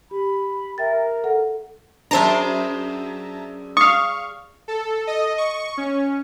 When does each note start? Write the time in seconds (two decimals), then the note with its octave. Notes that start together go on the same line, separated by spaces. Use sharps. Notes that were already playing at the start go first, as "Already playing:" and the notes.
0.11 G4 B5
0.78 A#4 E5 G5 A6
1.24 A4 F#5
2.11 F#2 D4 G#4 C5 D5 E5 A5 A#5
3.77 F5 C#6 D#6
4.68 A4
5.07 D#5
5.38 C#6
5.77 C#4